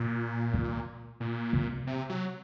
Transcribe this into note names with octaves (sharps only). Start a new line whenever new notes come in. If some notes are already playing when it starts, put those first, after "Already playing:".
Already playing: A#2
D#3
A#2
C3
C3
F#3